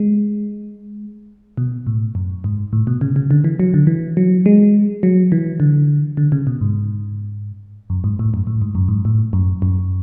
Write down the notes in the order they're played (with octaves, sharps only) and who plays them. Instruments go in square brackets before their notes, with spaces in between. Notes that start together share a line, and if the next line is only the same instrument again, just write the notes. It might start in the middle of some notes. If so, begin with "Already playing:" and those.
Already playing: [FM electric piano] G#3
B2
A2
F#2
G#2
A2
B2
C#3
C#3
D3
E3
F#3
D3
E3
F#3
G#3
F#3
E3
D3
D3
C#3
B2
G#2
F#2
G#2
A2
F#2
A2
G#2
F#2
G#2
A2
F#2
F#2